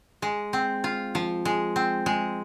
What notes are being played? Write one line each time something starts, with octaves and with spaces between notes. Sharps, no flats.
G#3
C4
F4
F3
G#3
C4
G#3